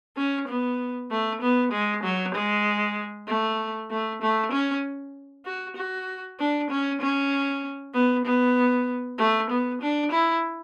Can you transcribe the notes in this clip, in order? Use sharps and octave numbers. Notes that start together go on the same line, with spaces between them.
C#4
B3
A3
B3
G#3
F#3
G#3
A3
A3
A3
C#4
F#4
F#4
D4
C#4
C#4
B3
B3
A3
B3
D4
E4